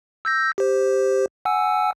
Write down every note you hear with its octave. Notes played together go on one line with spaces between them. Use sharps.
E6 G6 A#6
G4 C5
F#5 G#5 E6